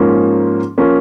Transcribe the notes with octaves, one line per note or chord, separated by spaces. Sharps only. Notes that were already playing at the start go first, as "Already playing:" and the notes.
Already playing: G#2 F3 A#3 C#4
F3 A#3 C#4